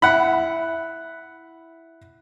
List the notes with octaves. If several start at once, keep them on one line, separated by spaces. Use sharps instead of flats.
E4 F#5 B5